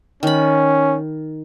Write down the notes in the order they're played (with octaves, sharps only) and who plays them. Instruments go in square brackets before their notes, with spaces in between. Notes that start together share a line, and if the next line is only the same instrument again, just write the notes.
[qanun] D#3 B5 [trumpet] C#4